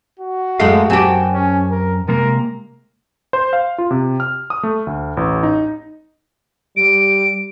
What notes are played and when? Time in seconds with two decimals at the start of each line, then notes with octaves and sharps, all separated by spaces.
0.19 F#4
0.60 F#2 G#3 A3 F5
0.90 F#2 C4 G4 G#5 A5
1.33 C#4
1.71 A#4
2.08 C3 G#3 A#3 A#4
3.33 C5
3.53 F5
3.78 F4
3.91 C3
4.20 F6
4.50 D#6
4.63 A3
4.87 D2
5.17 A1
5.43 D#4
6.77 G3 D7